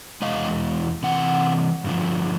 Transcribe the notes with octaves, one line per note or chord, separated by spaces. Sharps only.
E2 B2 G#3 D#5 F5
C3 E3 F#5
G2 D3 F3